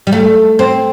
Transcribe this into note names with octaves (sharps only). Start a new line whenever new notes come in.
G3
A3
C4